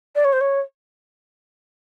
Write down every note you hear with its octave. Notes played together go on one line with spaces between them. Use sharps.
D5
C#5
C5
C#5